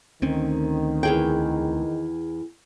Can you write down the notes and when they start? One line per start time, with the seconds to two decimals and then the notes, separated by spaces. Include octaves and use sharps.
0.22 D2 D#3 C4 C#4
1.03 E2 G#4 G5